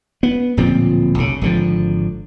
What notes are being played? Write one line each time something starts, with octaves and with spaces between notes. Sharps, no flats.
B3
D1 A#2 F3 C4
B1 C#3
G#1 D3 F3